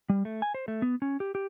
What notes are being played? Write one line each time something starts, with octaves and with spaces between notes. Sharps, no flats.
G3
A3
G#5
C5
A3
B3
C#4
G4
G4